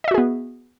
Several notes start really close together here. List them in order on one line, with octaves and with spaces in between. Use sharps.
D#5 E5 F#4 G#4 B3